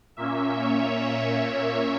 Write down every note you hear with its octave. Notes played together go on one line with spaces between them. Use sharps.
A#2 A#3 C#4 E5
C#5
C#5